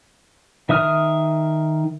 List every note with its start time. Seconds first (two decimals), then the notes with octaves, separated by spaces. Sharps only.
0.69 D#3 E5 D#6 F6